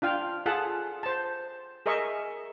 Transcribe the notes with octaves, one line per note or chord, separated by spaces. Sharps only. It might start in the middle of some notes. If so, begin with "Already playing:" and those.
D4 F4 F5 G5
F4 G#4 A4 F#5 A5
C5 A5
G#4 A#4 D#5 E5 C#6